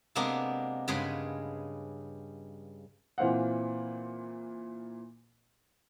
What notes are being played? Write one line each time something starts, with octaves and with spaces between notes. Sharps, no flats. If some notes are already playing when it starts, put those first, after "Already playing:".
C3 G#3 A#3 B3 D4
G2 C#3 G#3 G#4 B4 C6
A#2 E3 C4 F5 F#5